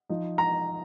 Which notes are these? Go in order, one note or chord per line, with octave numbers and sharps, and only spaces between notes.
F3 D#4
A#5